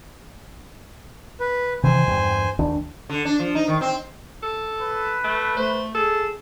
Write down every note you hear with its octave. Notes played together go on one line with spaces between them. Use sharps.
B4
C3 D#3 E3 C5 G#5
E2 G2 G3
E1 D#2 D4
D3
D4
F3
D#4
D#3
C4
A4
B4
A3
A3 C5
G#4 A4